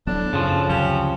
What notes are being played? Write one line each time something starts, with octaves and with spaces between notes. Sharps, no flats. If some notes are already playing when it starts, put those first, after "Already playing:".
D#1 A2 F#3 B3 D4
F#2 C#3 F3
D2 F#3 C4 C#4 G4